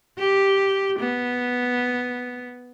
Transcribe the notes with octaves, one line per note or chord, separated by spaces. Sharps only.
G4
B3